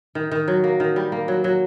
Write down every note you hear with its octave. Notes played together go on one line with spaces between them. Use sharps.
D#3
D#3
F#3
A#3
D#3
G3
A#3
F#3
F#3